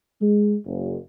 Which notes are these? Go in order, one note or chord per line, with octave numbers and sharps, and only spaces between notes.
G#3
F#1